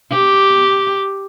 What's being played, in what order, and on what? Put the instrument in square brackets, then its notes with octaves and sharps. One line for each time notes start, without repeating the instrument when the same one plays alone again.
[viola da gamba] G4